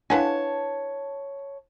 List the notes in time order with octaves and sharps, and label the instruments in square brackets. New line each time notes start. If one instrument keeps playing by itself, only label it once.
[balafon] D4 E4 F5 [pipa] B4 F#5 G#5 [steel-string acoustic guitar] C#5 A5